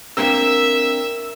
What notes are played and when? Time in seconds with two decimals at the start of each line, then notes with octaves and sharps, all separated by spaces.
0.17 A#3 C4 D4 A#4 E5 E6